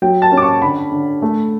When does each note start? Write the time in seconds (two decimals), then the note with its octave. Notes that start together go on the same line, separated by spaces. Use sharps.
0.02 F#3 G5
0.22 A5
0.32 C#4
0.37 D6
0.42 C#6
0.62 D3 B5
0.92 D3
1.22 A3